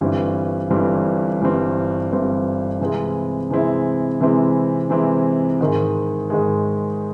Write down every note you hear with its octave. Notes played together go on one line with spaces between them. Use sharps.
G1 G2 E3 G3 C4
G1 G2 E3 G3 C4
G1 G2 E3 G3 C4
G1 G2 E3 G3 C4
C3 E3 G#3 C4 E4
C3 E3 G#3 C4 E4
C3 E3 G#3 C4 E4
C3 E3 G#3 C4 E4
G#2 D#3 G#3
G#2 D#3 G#3